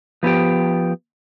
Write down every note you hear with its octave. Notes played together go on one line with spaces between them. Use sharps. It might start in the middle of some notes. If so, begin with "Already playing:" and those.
F3 B3 D#4 G4 G5